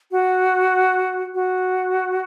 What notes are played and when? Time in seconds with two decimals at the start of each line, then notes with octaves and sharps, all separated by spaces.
0.11 F#4
1.34 F#4